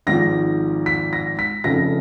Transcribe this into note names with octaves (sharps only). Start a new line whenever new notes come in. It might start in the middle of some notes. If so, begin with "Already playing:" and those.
G#1 G#2 F3 A#6
B6
A#6
B6
F1 F2 C#3 A#6